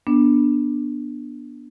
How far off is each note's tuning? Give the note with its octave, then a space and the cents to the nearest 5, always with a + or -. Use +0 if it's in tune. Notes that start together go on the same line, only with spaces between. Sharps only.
B3 -25 D4 +0